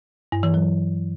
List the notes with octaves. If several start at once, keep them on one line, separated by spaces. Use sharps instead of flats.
G2
E3
F#3